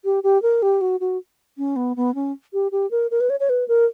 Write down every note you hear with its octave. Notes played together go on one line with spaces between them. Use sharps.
G4
G4
A#4
G4
F#4
F#4
C#4
B3
B3
C#4
G4
G4
A#4
A#4
B4
C#5
C#5
B4
A#4